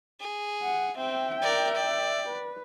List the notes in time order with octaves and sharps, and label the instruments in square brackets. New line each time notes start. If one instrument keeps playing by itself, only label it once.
[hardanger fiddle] G#4
[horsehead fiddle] F#5
[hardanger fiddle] C4 [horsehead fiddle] E5 G5
[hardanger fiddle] A#4 D5
D5
[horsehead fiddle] B4